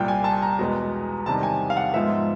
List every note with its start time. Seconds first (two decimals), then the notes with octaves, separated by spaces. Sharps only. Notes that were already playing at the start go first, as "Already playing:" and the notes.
Already playing: C2 A#2 G3 G5
0.08 G#5
0.24 A5
0.42 A#5
0.59 E2 B2 G#3 B3
1.26 E2 C3 D#3 G3 A5
1.43 G#5
1.70 F5
1.77 F#5
1.94 G#2 F3 G#3 B3 E5